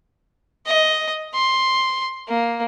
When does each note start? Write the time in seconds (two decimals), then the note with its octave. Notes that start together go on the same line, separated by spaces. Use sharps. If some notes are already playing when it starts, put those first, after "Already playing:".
0.66 D#5
1.34 C6
2.28 A#3